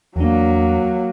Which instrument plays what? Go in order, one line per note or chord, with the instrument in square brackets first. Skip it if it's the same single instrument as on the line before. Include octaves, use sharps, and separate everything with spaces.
[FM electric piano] E2 D4 [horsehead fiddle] F#3 A#3